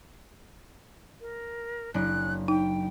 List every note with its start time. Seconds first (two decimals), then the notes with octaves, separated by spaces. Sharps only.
1.21 A#4
1.94 F#1 D4 F#6
2.48 D#4 G5